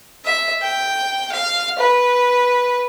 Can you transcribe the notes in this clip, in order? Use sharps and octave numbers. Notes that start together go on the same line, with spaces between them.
E5
G5
F5
B4